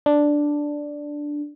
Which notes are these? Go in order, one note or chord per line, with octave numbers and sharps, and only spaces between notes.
D4